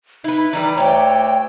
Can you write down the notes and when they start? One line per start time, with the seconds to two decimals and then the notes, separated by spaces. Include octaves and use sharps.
0.24 D#4 E4 B4
0.53 E3 G3 B4 A#5
0.77 D2 C#5 D5 G5